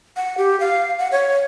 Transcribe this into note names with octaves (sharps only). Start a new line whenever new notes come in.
F#5
G4
F5
F#5
C#5